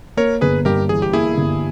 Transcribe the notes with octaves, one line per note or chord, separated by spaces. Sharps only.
A#3 A#4 C#5
G1 G#4 B4
G2 G4 A#4
E3 G#4
G4
A#3 E4 G#4
G1